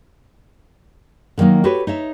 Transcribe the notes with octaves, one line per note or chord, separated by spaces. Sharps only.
D3 D#3 F#3 A#3 D#4
F#4 G4 A4 B4 C#5
D#4 C#5 E5